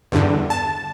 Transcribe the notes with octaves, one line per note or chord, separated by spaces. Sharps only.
E2 G2 D3
A5